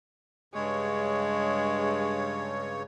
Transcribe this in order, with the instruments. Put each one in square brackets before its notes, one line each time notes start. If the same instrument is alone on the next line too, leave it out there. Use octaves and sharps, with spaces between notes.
[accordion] G2 C#3 C#5 [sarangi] G#3